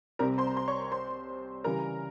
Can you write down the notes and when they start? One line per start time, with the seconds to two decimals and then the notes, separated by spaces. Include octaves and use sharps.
0.19 C2 C3 G3 C4 G4 A#4 A#5
0.38 C5 C6
0.47 A#5
0.56 C5 C6
0.68 C#5 C#6
0.92 C5 C6
1.64 C#3 E3 G3 A#4 A#5